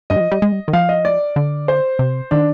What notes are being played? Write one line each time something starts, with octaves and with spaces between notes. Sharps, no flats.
G2 D#5
G3
F3
G3
G#3
G3
D#3
F3 F5
D#5
D5
D3
C5
C3
D#3 D4